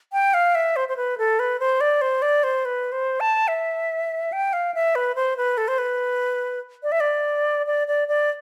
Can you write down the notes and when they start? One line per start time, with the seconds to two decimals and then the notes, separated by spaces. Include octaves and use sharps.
0.13 G5
0.34 F5
0.55 E5
0.76 C5
0.89 C5
0.97 B4
1.18 A4
1.39 B4
1.60 C5
1.81 D5
2.01 C5
2.22 D5
2.44 C5
2.65 B4
2.92 C5
3.20 A5
3.48 E5
4.32 G5
4.53 F5
4.74 E5
4.95 B4
5.15 C5
5.37 B4
5.58 A4
5.68 C5
5.78 B4
6.83 D5
6.92 E5
7.00 D5
7.66 D5
7.88 D5
8.08 D5